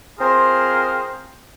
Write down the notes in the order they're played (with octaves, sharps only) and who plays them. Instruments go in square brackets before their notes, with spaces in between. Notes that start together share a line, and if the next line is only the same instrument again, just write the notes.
[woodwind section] C4 F4 G#4 A#4 C5